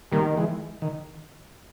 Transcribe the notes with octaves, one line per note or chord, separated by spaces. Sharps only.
D#3 G3 A#3
E3 G#3
D#3